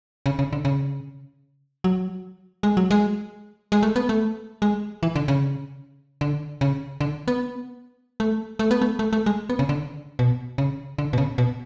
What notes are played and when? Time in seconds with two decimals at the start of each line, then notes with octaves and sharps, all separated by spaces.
0.26 C#3
0.39 C#3
0.53 D3
0.65 C#3
1.84 F#3
2.63 G#3
2.77 F#3
2.91 G#3
3.72 G#3
3.83 A3
3.96 B3
4.09 A3
4.62 G#3
5.03 E3
5.16 D3
5.28 C#3
6.21 D3
6.61 C#3
7.01 D3
7.28 B3
8.20 A3
8.59 A3
8.71 B3
8.82 A3
8.99 A3
9.13 A3
9.26 G#3
9.50 B3
9.59 C#3
9.69 D3
10.19 B2
10.58 C#3
10.98 D3
11.13 B2
11.18 C#3
11.38 B2